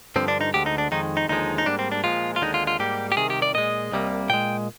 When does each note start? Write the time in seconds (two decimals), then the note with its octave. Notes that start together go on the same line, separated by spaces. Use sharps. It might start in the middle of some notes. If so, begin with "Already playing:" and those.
0.16 G2 D3 F3 C4
0.28 D4
0.41 D#4
0.54 D2 D3 G#3 G4
0.66 D#4
0.78 D4
0.91 F2 D#3 G#3 D#4
1.17 D#4
1.28 D#2 D3 F3 G#3 D#4
1.58 D#4
1.66 G#2 G3 A#3 D4
1.79 C4
1.92 D4
2.04 A#2 F3 G#3 F4
2.36 F4
2.41 D#2 D3 G#3 D#4
2.54 F4
2.67 F4
2.79 G#2 G3 A#3 G4
3.12 G4
3.17 C2 C3 D#3 G#4
3.30 G4
3.42 D5
3.54 A#2 G#3 D#5
3.92 C2 C3 G3 A#3
4.30 A#2 G#3 G5